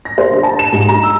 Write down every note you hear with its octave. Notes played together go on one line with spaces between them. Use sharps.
A#6
C5
D3
A5
E7
G#2
A#5
E6